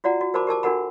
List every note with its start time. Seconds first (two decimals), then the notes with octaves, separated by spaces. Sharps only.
0.04 F4 F#4 D5 F#5 A#5
0.21 F#4
0.34 F#4 A#4 C5 A5 B5 D6
0.47 G4 A#4 A5 D6
0.63 D4 F#4 A4 A#4 F#5 B5